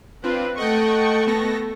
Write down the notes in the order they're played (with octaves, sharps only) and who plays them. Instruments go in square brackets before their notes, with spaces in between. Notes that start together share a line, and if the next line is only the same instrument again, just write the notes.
[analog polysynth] C4 D4 F4 [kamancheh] B4
[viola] A3 [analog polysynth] D#5 F#5 G5 [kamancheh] A5 C#6
[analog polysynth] B3 A4 A#6